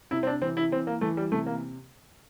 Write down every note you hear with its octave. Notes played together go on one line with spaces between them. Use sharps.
C3 E4
C4
D4
E3 C4
E4
E3 C4
A#3
E3 A3
G3
C3 A3
A#3